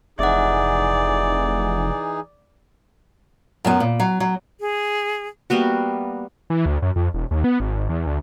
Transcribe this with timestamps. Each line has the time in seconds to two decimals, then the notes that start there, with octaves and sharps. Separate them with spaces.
0.19 F1 E3 D#4 G#4 D5 E5 F#5
3.65 F#2 F#3 B3
3.80 A#2
4.00 F#3
4.20 F#3
4.60 G#4
5.50 G3 A#3 B3 F#4
6.50 E3
6.66 D2
6.82 F#2
6.96 F2
7.14 E1
7.31 D#2
7.44 B3
7.60 G#1
7.89 E2
8.06 D2